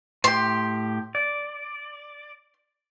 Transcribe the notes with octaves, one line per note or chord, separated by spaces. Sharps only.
A2 G4 C6
D5